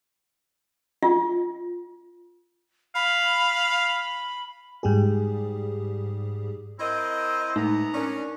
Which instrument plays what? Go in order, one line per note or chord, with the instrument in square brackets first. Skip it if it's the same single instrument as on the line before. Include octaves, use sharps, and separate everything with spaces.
[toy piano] F4
[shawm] F5 [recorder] B5
[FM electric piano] G#2 G3 G4 G#4
[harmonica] C4 [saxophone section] E4 A#4 D#5
[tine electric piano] A2 G#3 A3 [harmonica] B3 A#5 [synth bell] D#4
[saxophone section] C#4 D4 [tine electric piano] A#4 D5